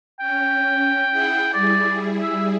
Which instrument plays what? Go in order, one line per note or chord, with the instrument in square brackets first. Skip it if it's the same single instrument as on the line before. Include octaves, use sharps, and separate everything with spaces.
[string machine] C#4 [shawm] G5
[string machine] E4 G#4 F#5
[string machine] G3 E4 G#4 [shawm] D5
[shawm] E5